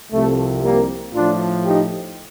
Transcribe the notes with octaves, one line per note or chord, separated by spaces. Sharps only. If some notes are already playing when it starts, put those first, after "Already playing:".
C2 C3 F3 A3
G3 A#3
A2 F3 D4 F4
D#4 G4